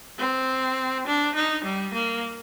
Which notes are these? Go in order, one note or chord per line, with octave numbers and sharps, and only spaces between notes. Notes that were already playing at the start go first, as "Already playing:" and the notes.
C4
D4
D#4
G3
A#3